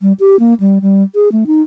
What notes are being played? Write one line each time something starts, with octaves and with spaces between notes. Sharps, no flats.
G3
G4
A#3
G3
G3
G#4
A3
D#4